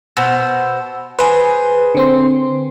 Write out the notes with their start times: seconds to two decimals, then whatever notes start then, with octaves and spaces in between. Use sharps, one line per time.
0.17 B2 C5 E6
1.19 G#4 B4 C5
1.95 D3 C4 C6